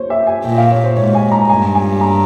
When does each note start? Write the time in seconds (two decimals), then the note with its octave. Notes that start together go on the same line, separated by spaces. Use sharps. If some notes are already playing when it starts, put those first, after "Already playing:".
Already playing: C5 C#5
0.10 E5
0.27 G#5
0.45 A#2 G5
0.58 F5
0.71 C#5
0.84 C5
0.96 G#2 C#5
1.15 G#5
1.32 A#5
1.50 G2 G#5
1.75 G#5
2.01 A#5